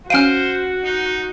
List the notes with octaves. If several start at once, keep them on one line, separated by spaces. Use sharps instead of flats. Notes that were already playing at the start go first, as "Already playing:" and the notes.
C#4 F#4 C5 F5 F6 D7 D#7
D#4